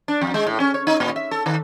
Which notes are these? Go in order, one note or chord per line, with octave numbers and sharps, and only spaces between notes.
D4
F2
G#3
A2
C#4
C#5
D#4
A#2
E5
A4
D#3